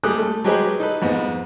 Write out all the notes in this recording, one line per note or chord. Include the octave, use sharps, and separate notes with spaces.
G3 A3 G4 G#4 D#6 F#6
A3
F#3 G#3 G4 G#4 B4 C5
D#4 A4 B4
F2 G#2 B3